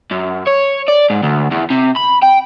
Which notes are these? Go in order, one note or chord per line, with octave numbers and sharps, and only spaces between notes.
F#2
C#5
D5
G#2
D2
E2
C3
B5
G5